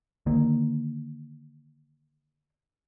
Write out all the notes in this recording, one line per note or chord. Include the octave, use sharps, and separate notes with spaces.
D3 D#3 A#3